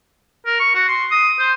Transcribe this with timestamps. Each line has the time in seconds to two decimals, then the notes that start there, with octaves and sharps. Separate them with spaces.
0.46 A#4
0.60 C#6
0.74 F#4
0.88 C6
1.11 D#6
1.39 C5